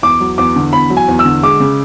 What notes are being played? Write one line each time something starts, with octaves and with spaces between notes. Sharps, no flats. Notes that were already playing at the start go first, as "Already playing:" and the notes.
E2 D6
F#3
E2 D6
D3
E2 B5
F#3
G#5
E2
E6
D3
G#3 D6
C#3